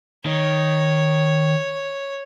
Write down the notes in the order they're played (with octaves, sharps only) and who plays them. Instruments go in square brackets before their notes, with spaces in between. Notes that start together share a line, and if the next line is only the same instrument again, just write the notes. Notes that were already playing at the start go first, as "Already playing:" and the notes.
[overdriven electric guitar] D#3 [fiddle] C#5